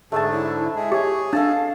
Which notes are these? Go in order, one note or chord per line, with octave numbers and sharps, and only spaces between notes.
G#2 D3 A3 D4 G#4 E5 A5
E4 C#5
G#3 G#4 E5
G4 G#4 C#5 G#5
D4 A4 D#5 F5 A5